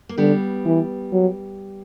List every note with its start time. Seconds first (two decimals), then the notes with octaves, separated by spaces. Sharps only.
0.09 A#3
0.18 D3 G3 B3
0.65 E3
1.13 F#3